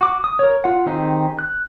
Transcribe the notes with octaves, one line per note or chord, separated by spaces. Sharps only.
F#4 D6
D#6
A#4 C#5
F4 F#5
D#3 C4 D#4 G4 G#4
F#6